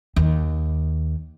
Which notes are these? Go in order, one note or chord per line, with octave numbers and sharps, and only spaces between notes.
D#2